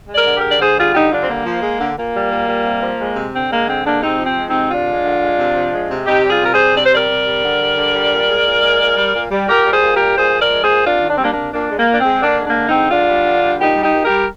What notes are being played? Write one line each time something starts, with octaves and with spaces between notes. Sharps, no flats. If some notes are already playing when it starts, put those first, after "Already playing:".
G#3
A#4 D5
D3
G4 A#4
G#3
D5
D3 G#4 C5
G3 F4 G#4
D3 D#4 G4
G3 D4 F4
C4
D3 A#3
F3
G#3
D3
A#2 A#3
G3
A#2
G3
C3
F3
G#3
C3
D3 C4
G#3 A#3
D3 C4
G#3 A#3 D4
C3 C4 D#4
F3
C4
G#3
C4 D#4
C3
D3 D4 F4
G#3
D3
G#3
C3
F3
G#3
C3
C3 D#4 G4
G3
F4 G#4
C3 A#4
G#4 C5
G3
C3 D5
C5
G3 A#4 D5
C3
G3
D3
G3
D3
G3
A#2
G#3
A#2
G#3
A#2
G3
A#2
G3
A#2 G4 A#4
G3
G#4 C5
A#2
G4 A#4
G3
A#2 G#4 C5
F3
A#4 D5
G#3
G#4 C5
A#2
C3 D4 F4
D#3
D4
C4
G3 A#3 D4
A#3 D4
C3
A#2 A#3 D4
G#3
A#3
A#2
D4
C4
G#3
D3 A#3 D4
G#3
A#3 D4
D3
C4 D#4
G#3
D3 D4 F4
G3
D3
G3
A#2 D#4 G4
G3
D#4 G4
A#2
G4 A#4
G3